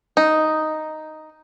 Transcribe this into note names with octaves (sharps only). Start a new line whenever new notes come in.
D#4